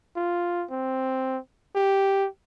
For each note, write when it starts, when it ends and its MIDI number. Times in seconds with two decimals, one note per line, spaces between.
0.16 0.65 65
0.71 1.38 60
1.75 2.27 67